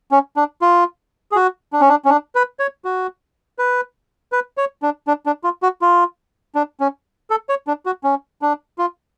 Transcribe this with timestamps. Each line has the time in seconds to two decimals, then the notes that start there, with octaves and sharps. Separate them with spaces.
0.11 C#4
0.36 D4
0.62 F4
1.32 G#4
1.36 F#4
1.73 D4
1.81 C#4
1.89 D4
2.05 C#4
2.09 D4
2.35 B4
2.59 C#5
2.85 F#4
3.59 B4
4.32 B4
4.57 C#5
4.82 D4
5.07 D4
5.26 D4
5.44 F4
5.62 F#4
5.82 F4
6.55 D4
6.80 C#4
7.30 A4
7.49 C#5
7.67 D4
7.86 F#4
8.04 C#4
8.42 D4
8.78 F4